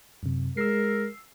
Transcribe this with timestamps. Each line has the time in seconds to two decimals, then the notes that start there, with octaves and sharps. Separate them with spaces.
0.23 F#2 C3
0.57 G#3 A#4 E6 C7